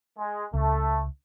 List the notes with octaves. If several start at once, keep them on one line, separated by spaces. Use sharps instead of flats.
G#3
C#2 A3